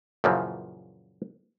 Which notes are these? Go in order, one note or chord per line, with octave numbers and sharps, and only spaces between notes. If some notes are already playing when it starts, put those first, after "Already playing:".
F#2 A#2 C#3 E3 F3